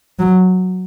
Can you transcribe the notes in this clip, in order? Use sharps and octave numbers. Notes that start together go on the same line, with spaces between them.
F#3